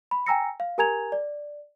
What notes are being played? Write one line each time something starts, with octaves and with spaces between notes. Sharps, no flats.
B5
G5 G#5 A#5 E6 A#6 C#7
F5
G4 A#4 G#5 A#5 G#6 F7
D5